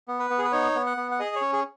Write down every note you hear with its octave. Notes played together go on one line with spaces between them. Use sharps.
B3
B4
B3
G#4
B4
D#4 C#5
B3
F#5
B3
F#5
G#4 D#5
C#5
C#4
G#4